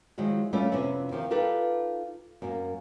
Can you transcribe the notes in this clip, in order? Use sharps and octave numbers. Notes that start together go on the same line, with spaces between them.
D#3 F3 F#3 G#3 E4
G3 A3 C#4 F4 E5
F2 C3 B3 C#4 E4
D#3 F3 G4
D#4 F4 G4 A4 B4
F#2 A#3